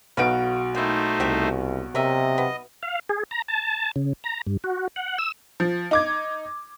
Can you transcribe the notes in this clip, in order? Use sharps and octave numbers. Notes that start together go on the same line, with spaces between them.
B1 D#4 F#4 B4 F5 D7
A3 A#3 D#4 E4 C5
C2 C3 G4 E5
C3 A#4 C#5 D#5 E5
B3
F5
G#4
A#5
A5
C#3
A#5
G2
F#4
F#5
E6
F3
D#4 D6 G#6